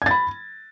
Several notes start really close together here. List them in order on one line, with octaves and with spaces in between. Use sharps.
G#6 A6 B5